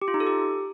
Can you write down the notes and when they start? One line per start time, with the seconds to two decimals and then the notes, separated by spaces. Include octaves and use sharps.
0.02 G4
0.08 F4
0.14 D#4
0.20 A4
0.27 G4